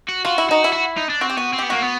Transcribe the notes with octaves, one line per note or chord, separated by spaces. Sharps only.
F#4
F4 F#4
E4
D#4 F#4
E4
F#4
D#4
D4
C4 F#4
G4
B3 F#4
C4
B3 G4
A#3 F#4
B3